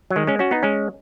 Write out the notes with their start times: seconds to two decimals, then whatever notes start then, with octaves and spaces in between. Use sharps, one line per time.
0.10 F#3
0.16 D#3 G#3
0.27 G#3 C#4
0.39 C#4 F#4
0.51 B3 D#4
0.63 G#3 C#4